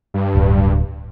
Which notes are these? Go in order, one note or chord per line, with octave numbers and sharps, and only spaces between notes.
G2
D1